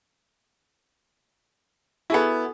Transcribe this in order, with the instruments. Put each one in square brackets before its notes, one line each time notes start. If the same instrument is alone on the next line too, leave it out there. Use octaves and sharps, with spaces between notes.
[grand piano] B3 E4 [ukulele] F#4 G#4 A4